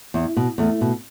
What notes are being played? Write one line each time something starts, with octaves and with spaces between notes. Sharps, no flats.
E2
B2
E2 A3
B2